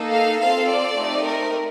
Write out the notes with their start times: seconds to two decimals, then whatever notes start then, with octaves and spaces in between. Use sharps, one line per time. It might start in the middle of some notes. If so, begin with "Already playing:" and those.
Already playing: A#3 D#4 A4
0.12 F5
0.40 C4 F4 A4 F5
0.68 D5
0.96 A3 C4 D#4 G4
1.25 A#4